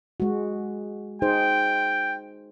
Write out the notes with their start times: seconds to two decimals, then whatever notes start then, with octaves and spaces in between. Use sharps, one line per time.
0.20 G#3 F#4
1.22 D#4 G#4 C5 G5